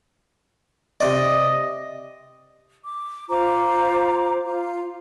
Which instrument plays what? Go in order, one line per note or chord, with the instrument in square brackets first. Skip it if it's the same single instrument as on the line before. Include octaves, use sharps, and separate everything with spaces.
[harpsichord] C3 D5 [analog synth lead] D#5
[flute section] D6
F4 C5 A#5 D6
F4